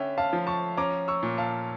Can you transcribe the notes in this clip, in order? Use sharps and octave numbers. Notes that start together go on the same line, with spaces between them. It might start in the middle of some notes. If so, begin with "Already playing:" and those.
Already playing: D3 C#4 E5 G5
F5 A5
F3
A5 C#6
C#4 A#5 D6
C#6 E6
A#2
F5 A5